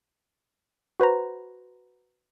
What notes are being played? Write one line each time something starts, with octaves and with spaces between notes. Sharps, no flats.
F#4 B4 C5 A#5